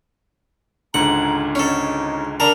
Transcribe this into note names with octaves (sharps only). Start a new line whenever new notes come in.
C#2 G#2 D3 F#5 A#5
C#4 D#4 A4
D3 A#4 A5 A#5